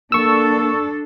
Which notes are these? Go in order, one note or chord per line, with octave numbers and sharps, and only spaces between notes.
A#3 D4 A4 C#6 E6